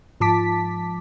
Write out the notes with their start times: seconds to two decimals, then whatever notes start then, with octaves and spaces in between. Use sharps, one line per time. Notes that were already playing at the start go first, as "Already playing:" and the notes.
0.20 G#2 F3 A5 D6 B6